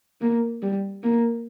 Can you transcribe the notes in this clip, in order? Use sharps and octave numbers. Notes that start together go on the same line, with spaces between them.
A#3
G3
A#3